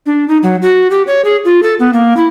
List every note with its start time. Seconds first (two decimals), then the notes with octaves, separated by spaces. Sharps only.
0.06 D4
0.28 D#4
0.43 F#3
0.62 F#4
0.91 G4
1.07 C#5
1.25 G#4
1.45 F4
1.63 A4
1.80 B3
1.93 A#3
2.17 E4